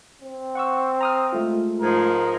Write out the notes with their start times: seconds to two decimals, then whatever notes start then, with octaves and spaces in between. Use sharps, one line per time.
0.21 C4
0.55 F#5 C#6 E6
1.01 A#5 D#6 F6
1.33 G#3 A3 F4
1.80 G#2 F3 A#4